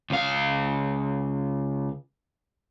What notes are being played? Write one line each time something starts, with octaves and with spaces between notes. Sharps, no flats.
C#2 F5